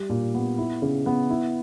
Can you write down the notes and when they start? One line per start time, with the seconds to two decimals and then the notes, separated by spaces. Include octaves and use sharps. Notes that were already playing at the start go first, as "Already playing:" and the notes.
Already playing: G3
0.10 A#2
0.34 B3
0.58 E4
0.82 C#3
1.06 B3
1.30 E4